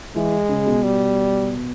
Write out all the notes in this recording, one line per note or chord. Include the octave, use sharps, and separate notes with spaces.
E3 G#3
C#3
B2
G3